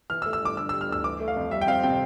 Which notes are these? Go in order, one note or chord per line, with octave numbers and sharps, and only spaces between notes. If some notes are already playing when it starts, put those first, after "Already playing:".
E3 F6
E6
A3
E6
G2 D6
D3 E6
E6
G3
F6
D2 E6
E3 D6
A3
F5
F2
G3 E5
G5
C4 F5
C3 G5